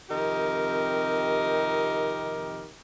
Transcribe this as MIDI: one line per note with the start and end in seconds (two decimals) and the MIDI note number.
0.10 2.69 41
0.10 2.69 48
0.10 2.69 51
0.10 2.69 63
0.10 2.69 67
0.10 2.69 70